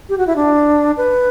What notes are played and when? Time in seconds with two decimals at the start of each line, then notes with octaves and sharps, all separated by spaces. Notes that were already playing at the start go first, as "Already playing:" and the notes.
0.09 G4
0.18 F#4
0.27 E4
0.36 D4
0.97 B4